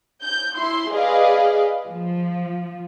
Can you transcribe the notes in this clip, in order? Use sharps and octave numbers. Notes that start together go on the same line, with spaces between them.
G6
E4 C6
G#4 B4 D5 D#5 F5
F3